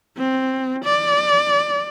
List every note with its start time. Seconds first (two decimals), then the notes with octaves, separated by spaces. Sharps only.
0.17 C4
0.84 D5